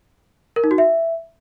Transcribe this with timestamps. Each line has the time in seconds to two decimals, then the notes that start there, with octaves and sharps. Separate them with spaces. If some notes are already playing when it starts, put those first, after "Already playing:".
0.56 A#4
0.64 D#4
0.71 F#4
0.78 E5